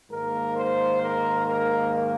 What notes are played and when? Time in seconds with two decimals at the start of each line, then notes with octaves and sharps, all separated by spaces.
0.11 G#2 D#3 A#3 A#4
0.57 C5
1.02 A#4
1.48 A#4